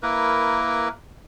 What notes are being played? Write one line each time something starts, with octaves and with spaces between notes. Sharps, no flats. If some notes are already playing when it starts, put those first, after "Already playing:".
A#3 E4 A#4 B4